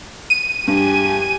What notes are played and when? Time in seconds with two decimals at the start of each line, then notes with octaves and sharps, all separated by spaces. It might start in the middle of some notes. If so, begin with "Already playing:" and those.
0.30 D#7
0.68 G2 G4 G#5